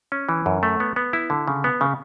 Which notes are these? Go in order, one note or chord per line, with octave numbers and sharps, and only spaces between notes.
C#4
E3
F#2
A3
B3
B3
E4
D3
C#3
B3
C#3